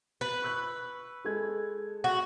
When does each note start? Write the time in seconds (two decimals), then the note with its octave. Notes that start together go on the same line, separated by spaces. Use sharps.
0.21 B4
0.42 C#6 E6 F#6
1.25 G#3 A4 G#6
2.04 F#4